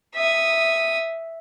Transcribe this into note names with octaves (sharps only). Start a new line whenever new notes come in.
E5 D#6